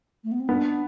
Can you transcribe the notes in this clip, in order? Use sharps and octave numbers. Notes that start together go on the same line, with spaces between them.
A3
B3
C4
B3 D4